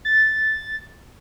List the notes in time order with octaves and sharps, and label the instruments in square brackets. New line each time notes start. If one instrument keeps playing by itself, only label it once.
[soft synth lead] A6